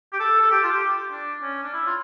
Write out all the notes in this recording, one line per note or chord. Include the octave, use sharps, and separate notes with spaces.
G4
A4
A4
G4
F4
G4
D4
C#4
D4
E4
F4